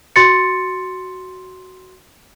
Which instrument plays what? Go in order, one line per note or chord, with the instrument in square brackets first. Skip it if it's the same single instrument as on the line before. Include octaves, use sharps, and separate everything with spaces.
[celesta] F#4 C6 A6 C#7